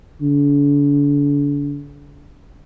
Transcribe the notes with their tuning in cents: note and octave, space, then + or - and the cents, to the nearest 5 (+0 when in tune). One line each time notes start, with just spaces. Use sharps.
D3 -40